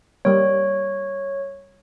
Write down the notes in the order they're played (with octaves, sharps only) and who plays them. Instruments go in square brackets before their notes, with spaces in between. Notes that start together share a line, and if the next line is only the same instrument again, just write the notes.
[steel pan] G3 A#3 [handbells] C#5